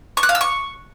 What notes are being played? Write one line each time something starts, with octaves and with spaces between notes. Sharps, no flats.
C#6
F#6
F5
E6
C#6